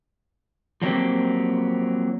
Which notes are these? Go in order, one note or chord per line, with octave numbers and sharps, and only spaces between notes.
F3 F#3 A#3 C4 G4